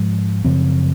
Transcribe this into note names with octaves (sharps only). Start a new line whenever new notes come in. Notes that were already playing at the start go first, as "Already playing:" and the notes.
Already playing: G#2 F3 G#3
F#2 C#3 F3 C4